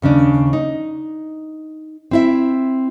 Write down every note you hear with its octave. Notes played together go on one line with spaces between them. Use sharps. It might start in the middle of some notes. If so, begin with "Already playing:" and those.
D#2 C#3 C#4 D4
D#4
C4 E4 E5